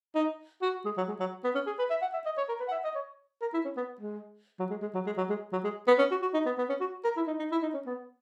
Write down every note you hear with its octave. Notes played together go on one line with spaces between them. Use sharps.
D#4
F#4
G#3
F#3
G#3
F#3
B3
C#4
G#4
B4
E5
F#5
E5
D#5
C#5
A#4
B4
F#5
E5
D#5
C#5
A#4
E4
C#4
B3
G#3
F#3
G#3
G#3
F#3
G#3
F#3
G#3
F#3
G#3
B3
C#4
F#4
F#4
D#4
B3
B3
C#4
F#4
A#4
E4
D#4
D#4
E4
D#4
C#4
B3